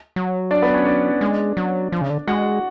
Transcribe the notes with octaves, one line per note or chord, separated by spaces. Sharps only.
F#3
D4 D5
B3 B4
C#4 C#5
D4 D5
G#3
F#3
F3
C#3
D3
G#3 F#4 F#5